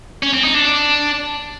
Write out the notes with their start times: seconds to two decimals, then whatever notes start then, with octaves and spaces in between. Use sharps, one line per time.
0.23 C#4
0.33 C4
0.44 D#4
0.55 D4
0.66 D4